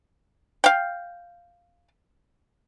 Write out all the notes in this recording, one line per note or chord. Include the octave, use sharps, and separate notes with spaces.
F5 G5